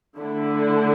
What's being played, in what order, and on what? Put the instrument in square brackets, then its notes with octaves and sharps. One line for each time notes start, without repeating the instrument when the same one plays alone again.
[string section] D3 A3 E4